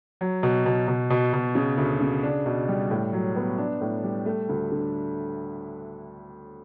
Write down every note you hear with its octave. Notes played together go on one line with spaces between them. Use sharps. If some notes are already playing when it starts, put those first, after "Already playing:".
F#3
B2
B2
B2
B2
B2
C#3
D2
C#3
D4
B2
G3
A2
F#3
B3
D4
A2
G3
A3
D2
D3